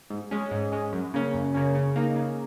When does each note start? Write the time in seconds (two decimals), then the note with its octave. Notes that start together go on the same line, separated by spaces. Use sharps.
0.10 G#2
0.31 G#3 C#4
0.51 G#2
0.72 G#3 C#4
0.92 F#2
1.14 C#3 A#3 C#4
1.34 F#2
1.54 C#3 A#3 C#4
1.75 C#3
1.96 A#3 D#4
2.16 C#3